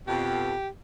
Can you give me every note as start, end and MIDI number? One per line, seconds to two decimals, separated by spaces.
0.07 0.53 41
0.07 0.53 47
0.07 0.68 67